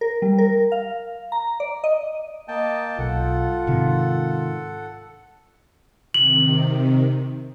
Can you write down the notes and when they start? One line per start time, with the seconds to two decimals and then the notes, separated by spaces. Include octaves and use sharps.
0.01 A#4
0.22 G3
0.38 A#4
0.72 F5
1.32 A#5
1.60 D5
1.84 D#5
2.48 A#3 D#5 G5 A5
2.99 B1 F4 A4 F#5
3.67 G#2 C3 D#3
6.14 C3 D#3 F#7